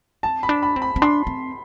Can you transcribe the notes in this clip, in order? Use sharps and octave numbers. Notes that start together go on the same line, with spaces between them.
C4 A5
B5
D4
B5
C4
B5
C4
D4 C6
C4